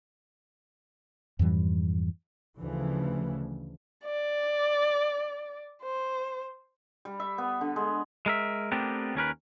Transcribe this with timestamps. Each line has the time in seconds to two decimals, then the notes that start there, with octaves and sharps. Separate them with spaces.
1.39 F2 G#2 E3 G3
2.59 D2 C#3 E3 F3
4.06 D5
5.83 C5
7.05 G3
7.20 E5
7.38 B3
7.61 D3
7.76 G#3
8.26 G#3 A#4 E5
8.72 A3 B3 C4 D4 G4 A#4
9.15 D#2 C#4 A#4 B4